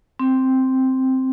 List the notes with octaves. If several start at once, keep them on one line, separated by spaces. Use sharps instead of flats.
C4